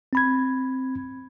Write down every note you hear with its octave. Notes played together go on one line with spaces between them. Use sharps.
C4 B5 G#6